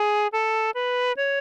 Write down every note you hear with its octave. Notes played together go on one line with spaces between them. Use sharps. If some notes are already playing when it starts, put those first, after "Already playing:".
Already playing: G#4
A4
B4
C#5